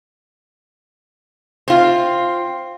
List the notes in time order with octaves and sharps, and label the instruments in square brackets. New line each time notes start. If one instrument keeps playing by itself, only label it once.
[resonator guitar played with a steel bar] C4 F4